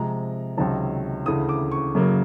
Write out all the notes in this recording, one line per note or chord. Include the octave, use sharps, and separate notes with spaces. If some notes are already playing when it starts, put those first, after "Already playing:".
Already playing: C3 F3 G#3 A#5
C#2 C3 D#3 F#3 A5
D2 C#3 E3 D#6
D6
C#6
F#2 C#3 F#3 A#3